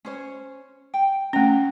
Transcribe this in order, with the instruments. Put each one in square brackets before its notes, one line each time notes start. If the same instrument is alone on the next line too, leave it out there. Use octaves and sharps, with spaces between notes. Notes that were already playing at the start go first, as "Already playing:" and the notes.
[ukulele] C#4 C5 C#5
G5
[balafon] A3 C#4 [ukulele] G5 A#5